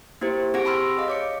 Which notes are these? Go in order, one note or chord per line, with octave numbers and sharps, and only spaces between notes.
A#3 E4 G4 C5
C4 G4 G#4 F#5 A#6 D7
A5 B5 C6 E6 F6
G#4 D#5 F5
C#5 D6 C#7